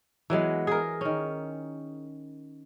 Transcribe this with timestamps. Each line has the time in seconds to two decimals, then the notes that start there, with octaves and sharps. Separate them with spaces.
0.30 E3 F#3 G#3 B3
0.67 G#4 A#4
1.01 D#3 C#4